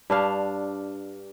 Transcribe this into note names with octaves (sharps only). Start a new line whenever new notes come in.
G2 D4 F5